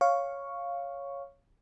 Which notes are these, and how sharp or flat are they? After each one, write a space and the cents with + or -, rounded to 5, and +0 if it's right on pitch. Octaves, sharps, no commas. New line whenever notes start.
C#5 +0 F5 +0 C#6 +0